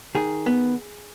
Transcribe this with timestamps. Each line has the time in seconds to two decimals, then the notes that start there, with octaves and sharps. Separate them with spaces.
0.15 D#3 G#4
0.46 B3